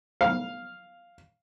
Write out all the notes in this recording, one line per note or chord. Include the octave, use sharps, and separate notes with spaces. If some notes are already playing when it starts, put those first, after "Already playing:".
F5